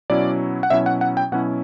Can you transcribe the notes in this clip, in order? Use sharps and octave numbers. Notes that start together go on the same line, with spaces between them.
B2 F#3 C#4 E4 D5
F#5
B2 F#3 C#4 E4 E5
F#5
F#5
G5
B2 F#3 C#4 E4 F#5